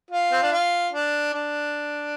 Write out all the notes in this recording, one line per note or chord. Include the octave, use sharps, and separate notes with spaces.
F4
C4
D4
F4
D4
D4